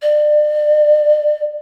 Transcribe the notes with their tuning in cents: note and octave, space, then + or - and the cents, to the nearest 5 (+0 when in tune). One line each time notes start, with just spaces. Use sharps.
D5 +35